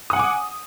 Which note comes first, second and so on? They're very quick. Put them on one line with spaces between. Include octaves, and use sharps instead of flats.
D#6 F#5 G#5 D6